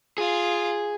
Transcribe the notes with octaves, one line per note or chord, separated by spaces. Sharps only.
F4 G#4